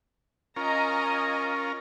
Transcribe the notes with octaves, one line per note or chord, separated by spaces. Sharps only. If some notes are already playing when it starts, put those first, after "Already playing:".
C#4 F4 A#4 D#5 G#5 A#5